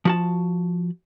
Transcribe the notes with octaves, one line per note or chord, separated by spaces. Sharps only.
F3 F#4 A5